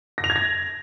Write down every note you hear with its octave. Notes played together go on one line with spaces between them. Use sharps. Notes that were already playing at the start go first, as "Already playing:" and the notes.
A#6
F7
G#6
A#6